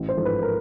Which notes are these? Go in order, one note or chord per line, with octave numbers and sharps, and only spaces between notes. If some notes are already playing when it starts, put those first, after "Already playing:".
Already playing: A1
C5
G#2 F3 A3
B4
A#4